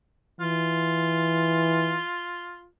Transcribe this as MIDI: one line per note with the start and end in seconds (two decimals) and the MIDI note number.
0.40 2.01 52
0.40 2.66 65